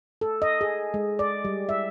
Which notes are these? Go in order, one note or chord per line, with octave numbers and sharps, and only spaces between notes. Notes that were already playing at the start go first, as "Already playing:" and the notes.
A4
D#5
G#4
G#3
D5
G3
E5